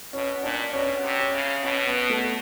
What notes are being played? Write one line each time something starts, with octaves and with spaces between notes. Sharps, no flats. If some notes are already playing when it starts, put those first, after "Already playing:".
B2 C#4
A#2 D4
B2 C#4
C3
C#4
C#3
B2 C#4
B3
A3